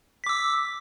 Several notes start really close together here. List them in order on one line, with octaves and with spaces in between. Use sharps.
B6 D6 E6